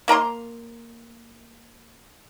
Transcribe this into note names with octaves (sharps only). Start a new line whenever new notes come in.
A#3 A#4 A#5 C6